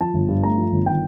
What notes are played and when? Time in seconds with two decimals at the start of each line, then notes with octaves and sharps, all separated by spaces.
0.01 F3 A5
0.14 G1
0.28 G2
0.43 A3 A#5
0.58 F3
0.72 G1
0.86 D#3 G5